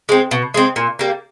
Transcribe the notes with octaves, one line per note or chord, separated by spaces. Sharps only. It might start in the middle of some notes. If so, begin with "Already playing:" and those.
G#3 C4
B2
G#3 C4
A#2
G3 A#3